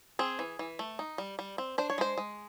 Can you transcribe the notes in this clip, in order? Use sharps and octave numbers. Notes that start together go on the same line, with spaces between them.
C4 G#4
E3
E3
A3
D#4
G3
G3
C4
D4 C5
C#5
G#3 C5
G#3